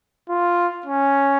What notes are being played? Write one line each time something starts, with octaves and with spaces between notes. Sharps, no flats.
F4
C#4